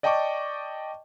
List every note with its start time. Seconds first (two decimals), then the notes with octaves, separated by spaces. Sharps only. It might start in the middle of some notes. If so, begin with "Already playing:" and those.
0.03 D5 D#5 G5 A5 C#6 D6